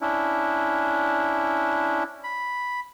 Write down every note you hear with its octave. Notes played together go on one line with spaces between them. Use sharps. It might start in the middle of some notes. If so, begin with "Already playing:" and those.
C#4 D4 E4
B5